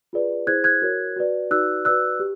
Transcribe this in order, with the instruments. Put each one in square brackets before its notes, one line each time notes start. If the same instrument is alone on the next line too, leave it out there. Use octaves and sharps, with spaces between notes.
[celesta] F4 G#4 B4 D5
E4 G#4 C5 F#6 G#6
F#6 G#6
F#4 A#4 C#5
F#4 B4 D5
D#4 F#4 B4 D5 E6 F#6
F#4 B4 D5 E6 F#6
G4